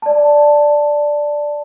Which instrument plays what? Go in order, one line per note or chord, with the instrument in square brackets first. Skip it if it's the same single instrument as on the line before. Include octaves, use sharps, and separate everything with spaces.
[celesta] D5 A5